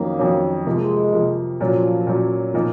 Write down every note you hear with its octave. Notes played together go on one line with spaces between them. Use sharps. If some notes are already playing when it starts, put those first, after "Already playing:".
Already playing: F2 D#3 F#3 A#3 C#4
F2 D#3 F#3 C#4
C3 F3 G#3 A#3
C3 F3 A#3
A#2 F3 F#3 C#4
A#2 F#3 C#4
A#2 F3 A#3 D#4